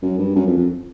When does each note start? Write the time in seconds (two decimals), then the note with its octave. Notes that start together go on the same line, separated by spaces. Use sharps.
0.02 F#2
0.19 G2
0.36 F#2
0.47 F2
0.57 F2